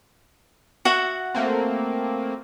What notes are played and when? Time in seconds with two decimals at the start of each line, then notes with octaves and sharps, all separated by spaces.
0.85 F#4 E5 F#5
1.35 A3 A#3 C4